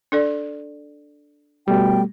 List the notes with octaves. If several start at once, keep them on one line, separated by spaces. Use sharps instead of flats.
D4 A4 D5
B2 G3 A3 G5